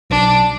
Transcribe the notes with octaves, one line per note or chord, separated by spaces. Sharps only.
B1 D4